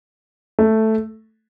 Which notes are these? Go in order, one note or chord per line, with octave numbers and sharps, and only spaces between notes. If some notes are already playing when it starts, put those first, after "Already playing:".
A3